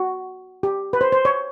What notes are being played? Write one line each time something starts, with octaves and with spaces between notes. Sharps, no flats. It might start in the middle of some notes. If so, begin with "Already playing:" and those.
Already playing: F#4
G4
B4
C5
C5
C#5